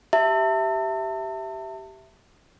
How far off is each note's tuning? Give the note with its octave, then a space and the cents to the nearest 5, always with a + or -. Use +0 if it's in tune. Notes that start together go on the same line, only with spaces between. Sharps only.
G4 -10 E5 +0 A5 +35